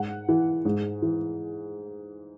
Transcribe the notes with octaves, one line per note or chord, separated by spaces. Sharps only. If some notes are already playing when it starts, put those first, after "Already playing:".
Already playing: G#2 F#5
E3
G#2
E3